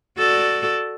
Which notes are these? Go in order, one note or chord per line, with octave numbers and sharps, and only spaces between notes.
F#4 A4 D5